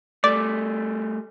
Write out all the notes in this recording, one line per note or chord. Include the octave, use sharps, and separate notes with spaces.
G3 A3 D5 D6